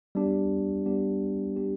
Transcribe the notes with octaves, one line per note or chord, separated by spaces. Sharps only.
G3 B3 D4 G4
G3 B3 D4 G4
G3 B3 D4 G4